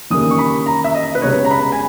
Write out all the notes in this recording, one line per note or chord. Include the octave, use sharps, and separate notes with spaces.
D#2 C#3 E3 G3 A#3 D#6
C#6
B5
A#5
E5
D#5
B4
C#2 B2 G3 B3 C#5
A#5
B5
G#5